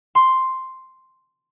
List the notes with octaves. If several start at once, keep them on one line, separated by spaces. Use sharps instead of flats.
C6